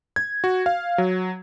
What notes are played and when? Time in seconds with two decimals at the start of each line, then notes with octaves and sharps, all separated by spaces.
0.16 G#6
0.44 F#4
0.66 F5
0.98 F#3